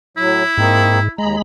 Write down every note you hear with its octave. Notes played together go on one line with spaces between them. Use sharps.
A2 F#3 E4
G#2 A#3 C4 D#4
D#2 G#3 A#5 B5